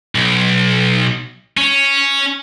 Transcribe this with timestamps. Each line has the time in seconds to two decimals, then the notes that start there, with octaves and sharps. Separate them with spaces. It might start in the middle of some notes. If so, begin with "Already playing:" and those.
0.15 B1
1.57 C#4